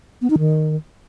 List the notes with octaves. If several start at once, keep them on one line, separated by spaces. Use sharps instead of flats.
B3
D#4
D#3